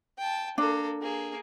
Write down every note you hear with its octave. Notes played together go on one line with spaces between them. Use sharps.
G5 A5
A#3 D4 A4
A#3 G#4